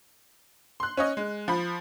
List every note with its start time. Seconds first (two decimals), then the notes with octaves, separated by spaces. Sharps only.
0.80 C6 F#6
0.97 C#4 C#5 D#5
1.17 G#3
1.48 F3 B5